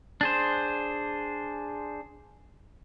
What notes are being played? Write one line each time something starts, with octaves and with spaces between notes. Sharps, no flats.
D4 G#4 C5